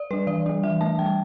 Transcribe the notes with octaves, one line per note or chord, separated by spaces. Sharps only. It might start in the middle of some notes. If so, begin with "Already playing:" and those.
Already playing: D5
G3 D4 B4
E3 D5
G3 D4
E3 E5
A3 D4 A5
G3 G5